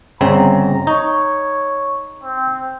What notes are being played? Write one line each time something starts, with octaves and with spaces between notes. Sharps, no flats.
G1 C#3 C4 A#5
D#4 C#5
C4